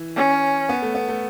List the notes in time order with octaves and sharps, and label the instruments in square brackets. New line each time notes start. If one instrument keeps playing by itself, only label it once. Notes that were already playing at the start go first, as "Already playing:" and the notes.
Already playing: [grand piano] E3
[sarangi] C#4
[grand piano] B3
A3
B3
A3